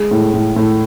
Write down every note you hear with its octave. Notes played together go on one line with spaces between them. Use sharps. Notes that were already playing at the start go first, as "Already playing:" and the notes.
Already playing: G#3
A2
A2
A2